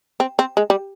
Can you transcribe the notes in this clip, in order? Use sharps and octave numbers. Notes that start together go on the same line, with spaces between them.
C4
C4
G#3
G3